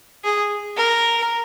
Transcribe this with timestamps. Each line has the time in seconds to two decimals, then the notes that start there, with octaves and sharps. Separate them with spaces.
0.24 G#4
0.77 A#4